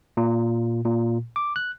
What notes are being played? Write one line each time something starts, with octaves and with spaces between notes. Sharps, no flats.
A#2
A#2
D6
F#6